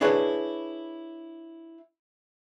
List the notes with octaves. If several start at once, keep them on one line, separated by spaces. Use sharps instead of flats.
D4 E4 G#4 B4 C#5